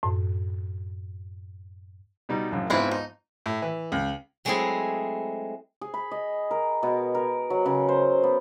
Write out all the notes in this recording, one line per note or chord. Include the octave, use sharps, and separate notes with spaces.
F#2 A2
B2 G3 D#4
A#1 F#2 A2
G#2 F3 G#3 B3 C4 E4
D#4
A2
E3
C#2
F#3 G#3 A3 C4 E4 G#4
G#4
B5
D#5
A#4
B2
A#4
F#3
C#3
C5
B3